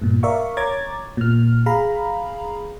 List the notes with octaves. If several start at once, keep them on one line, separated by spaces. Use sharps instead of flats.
G2 A#2
A#4 D5 E5 F5 C#6
C#5 A#5 D6 G#6 A6
A#2 F6
G#4 F5 A#5 B5